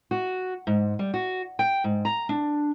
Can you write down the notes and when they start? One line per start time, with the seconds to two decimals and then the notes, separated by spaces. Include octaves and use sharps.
0.11 F#4
0.67 G#2
0.99 G3
1.14 F#4
1.59 G5
1.84 G#2
2.05 A#5
2.29 D4